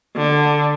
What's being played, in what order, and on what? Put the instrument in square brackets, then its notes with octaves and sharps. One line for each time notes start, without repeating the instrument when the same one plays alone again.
[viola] D3